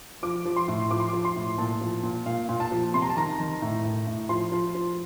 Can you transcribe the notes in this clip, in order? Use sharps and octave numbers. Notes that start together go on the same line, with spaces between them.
F3 D6
F3
C6
A2
F3 D6
C6
F3 D6
C6
A2
A#2 A5
F3
A#2
A#2 F5
A#2
A5
F3
C3 C6
A#5
A5
D#3 A#5
D#3
A2
A2
A2
F3 C6
F3
F3